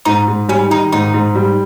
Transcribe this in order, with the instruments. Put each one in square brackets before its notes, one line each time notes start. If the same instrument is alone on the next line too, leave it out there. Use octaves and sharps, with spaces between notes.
[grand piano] G#2 [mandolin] D#4
[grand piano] G#2
[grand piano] G3 [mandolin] C#4
[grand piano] D#3 [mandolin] D#4
[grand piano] G#2 [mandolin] D#4
[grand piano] G#2
G3